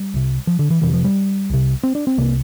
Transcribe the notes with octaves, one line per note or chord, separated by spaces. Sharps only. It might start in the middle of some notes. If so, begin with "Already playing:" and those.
Already playing: G3
C2 C3
F3
D3
E3
F2 C3 E3
F3
G3
C2 C3
C4
D4
C4
C2 C3 A#3